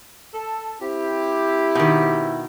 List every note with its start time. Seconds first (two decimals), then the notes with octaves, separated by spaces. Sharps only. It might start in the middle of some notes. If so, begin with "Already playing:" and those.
0.34 A4
0.81 C4 E4 G4
1.75 B2 D#3